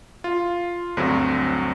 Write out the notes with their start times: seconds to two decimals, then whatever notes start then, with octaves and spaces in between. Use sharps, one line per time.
0.24 F4
0.97 D2 G2 D3 F#3 C4